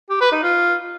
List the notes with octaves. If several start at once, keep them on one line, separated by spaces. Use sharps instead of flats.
G4
B4
D#4
F4